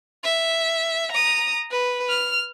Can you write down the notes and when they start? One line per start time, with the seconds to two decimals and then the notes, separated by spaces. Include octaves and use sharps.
0.24 E5
1.12 A#5 D#6
1.71 B4
2.09 F6